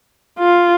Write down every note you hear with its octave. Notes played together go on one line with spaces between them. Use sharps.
F4